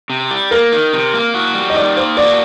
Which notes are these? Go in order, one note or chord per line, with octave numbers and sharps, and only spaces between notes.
C3
G3
A#3 A#4
D#3
C3
A#3
F#4
G3
D#5
D#3 D5
A#3 C5
F#4 D5